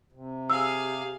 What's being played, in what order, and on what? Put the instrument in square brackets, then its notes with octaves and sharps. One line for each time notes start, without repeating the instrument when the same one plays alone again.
[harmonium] C3
[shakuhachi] G4 [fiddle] G#4 F5 [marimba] E6